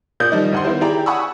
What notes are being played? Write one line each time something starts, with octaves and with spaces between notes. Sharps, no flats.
A#2 A#3 D5 D#6 G6
D#3 F3 G3 D#4
D2 F#5 C6
D#3 B3 E4 C5
E4 G4 G#4 D5 G5 A#5
F#5 G#5 B5 C#6 D#6 E6